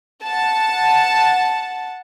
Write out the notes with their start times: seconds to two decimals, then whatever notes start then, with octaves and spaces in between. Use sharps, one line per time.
0.25 F#5 A5